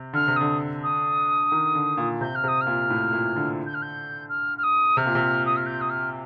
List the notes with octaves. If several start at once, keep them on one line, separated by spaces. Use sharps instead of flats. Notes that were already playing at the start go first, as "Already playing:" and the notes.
Already playing: C3
D3 F6
C3
D3 D#6
D#6
D#3
D3
A#2
C3 G6
F6
C3 D#6
F6
A#2
A2
A#2
D3
G6
F6
G6
F6
F6
D#6
C3 F6
A#2
C3
D#6
F6
G6
D#6
F6